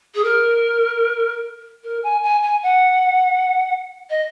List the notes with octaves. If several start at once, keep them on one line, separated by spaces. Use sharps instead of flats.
G#4
A#4
A#4
G#5
G#5
G#5
F#5
D#5